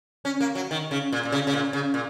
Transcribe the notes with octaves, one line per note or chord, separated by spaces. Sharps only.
C#4
A#3
F#3
D#3
C#3
A#2
A#2
C#3
C#3
A#2
C#3
A#2